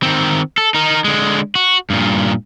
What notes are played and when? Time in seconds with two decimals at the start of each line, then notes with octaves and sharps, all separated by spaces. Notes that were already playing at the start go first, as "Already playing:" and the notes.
0.03 D#3 C4
0.58 A4
0.74 D#4 A#4
1.04 D3 G#3
1.55 F#4
1.90 G2 A#2